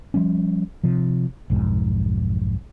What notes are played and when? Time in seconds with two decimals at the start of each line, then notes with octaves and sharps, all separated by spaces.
0.14 F3 G3 C#4
0.84 C3 F3
1.50 B1 F2 G#2